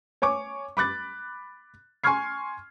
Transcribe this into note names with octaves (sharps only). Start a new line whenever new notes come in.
C#5 G#5 C#6 D6
B5 D6 F#6 A6
G#5 C6 C#6 F6 G#6 C7